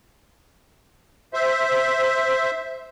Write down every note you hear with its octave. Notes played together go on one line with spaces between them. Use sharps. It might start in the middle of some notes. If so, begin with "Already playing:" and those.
C5 E5